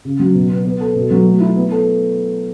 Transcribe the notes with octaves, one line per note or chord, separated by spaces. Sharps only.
C#3
F#3
B2
B3
B3
A4
B2
F#3
A3
E4
B3
A4